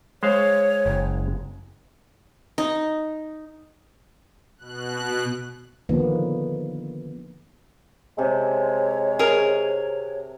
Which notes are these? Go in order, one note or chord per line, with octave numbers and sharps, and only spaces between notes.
G#3 C5 C#5 F5
F#1
D#4
B2 F#6
D3 D#3 F3 A#3 B3
C3 G#3 A4 C#5
G#4 A#4